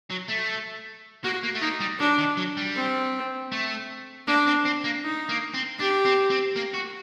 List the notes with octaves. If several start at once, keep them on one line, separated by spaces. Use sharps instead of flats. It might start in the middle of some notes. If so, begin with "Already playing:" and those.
F#3
A3
A#3 F#4
A#3
A3
A#3 D#4
G3
F#3 D4
D#3
F#3
G3
C4
A3
A#3 D4
C4
C4
A#3
D#4
A#3
C4
D4 G4
C4
C4
A#3
F#4